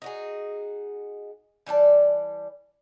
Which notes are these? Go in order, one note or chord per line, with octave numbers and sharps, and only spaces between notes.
D#4 F#4 G#4
E3 G3 D5 A5